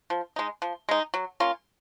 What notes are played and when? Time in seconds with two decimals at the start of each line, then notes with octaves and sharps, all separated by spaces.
0.10 F3
0.36 G#3 D#4
0.62 F3
0.89 G#3 D#4
1.14 F#3
1.40 A#3 C#4 F4